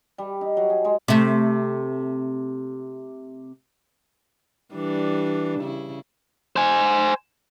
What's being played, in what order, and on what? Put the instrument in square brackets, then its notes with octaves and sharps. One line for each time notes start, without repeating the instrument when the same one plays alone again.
[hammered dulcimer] G3
D#4
F#3
G#4
G#3
[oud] C3 A3
[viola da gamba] E3 G3 D4
C#3 E4
[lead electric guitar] C5 G#5